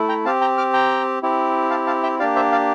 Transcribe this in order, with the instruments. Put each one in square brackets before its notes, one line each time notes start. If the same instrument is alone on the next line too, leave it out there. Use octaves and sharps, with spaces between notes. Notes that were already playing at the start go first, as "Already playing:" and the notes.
Already playing: [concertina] A3 E4
G5 A#5
C4 G4 F5 A5
G5 A#5
D6 F6
G5 A#5
C4 E4 G4
F5 A5
F5 A5
E5 G5
A#3 D4 G4 D5 F5
C5 E5
D5 F5